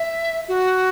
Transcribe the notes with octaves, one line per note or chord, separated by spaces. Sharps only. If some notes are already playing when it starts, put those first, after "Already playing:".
Already playing: E5
F#4